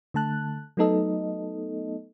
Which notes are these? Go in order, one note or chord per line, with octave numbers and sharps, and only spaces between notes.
D3 A3 A5 F#6
F#3 A3 B3 D#4 A4 D#5